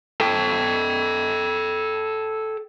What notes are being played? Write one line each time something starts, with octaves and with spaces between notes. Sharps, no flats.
A4 G5